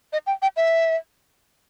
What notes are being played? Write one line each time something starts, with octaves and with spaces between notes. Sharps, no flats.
D#5
G5
G5
E5